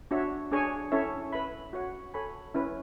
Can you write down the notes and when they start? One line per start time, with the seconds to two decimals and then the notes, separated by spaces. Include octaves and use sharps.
0.11 D4 F#4 C#5 E5
0.51 D4 G#4 C#5 G#5
0.92 C#4 E4 A4 C#5 E5
1.33 B4 E5 B5
1.73 F#4 C#5 F#5
2.14 A4 C#5 G#5 B5
2.54 C#4 E4 B4